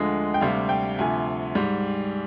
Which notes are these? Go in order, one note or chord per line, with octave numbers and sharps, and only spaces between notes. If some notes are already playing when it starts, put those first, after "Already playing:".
Already playing: D2 D3 F3 G#3 D#5
G5
D2 C3 G3 F5
G5
D2 C3 F3 G#5
G#2 G3